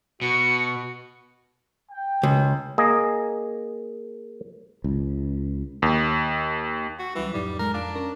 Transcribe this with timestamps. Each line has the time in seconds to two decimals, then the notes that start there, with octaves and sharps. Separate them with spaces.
0.22 B2 F#4 C#7
1.90 G5
2.23 C#2
2.78 A#3 G#4 D#5
4.84 C#2
5.82 D#2
6.99 F#4
7.15 C#2 E3 F#3 G3
7.34 F2 A2 G3 D#4
7.59 A2 G#3 A#4
7.74 F2 D4 F5 D7
7.95 C#4 A#4 A#5